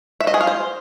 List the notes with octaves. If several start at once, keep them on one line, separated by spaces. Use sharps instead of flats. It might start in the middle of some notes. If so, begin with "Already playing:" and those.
E5
D#5
G#4
F5
C5